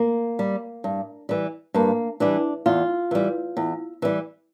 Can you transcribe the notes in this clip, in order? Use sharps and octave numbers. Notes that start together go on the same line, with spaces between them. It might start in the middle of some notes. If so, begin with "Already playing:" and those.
Already playing: A#3
G3
G2
E3 G3
G2 A#3
E3 G3 D4
E2 F4
E3 G3
E2
E3 G3